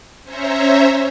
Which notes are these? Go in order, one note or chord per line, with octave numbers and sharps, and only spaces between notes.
C#4 C5 C#5 E5 A#5